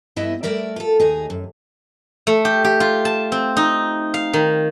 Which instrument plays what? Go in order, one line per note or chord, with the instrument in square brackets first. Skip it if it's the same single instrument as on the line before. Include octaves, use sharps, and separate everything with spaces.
[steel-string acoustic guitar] G2 E3 B3 E4 D#5 E5
G3 A3 A#4 D5 E5
F4 A4
D#2 D#4 G#4
F#2
[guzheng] A3
G4
G4
F4
A5
C4
D#4
F5
D#3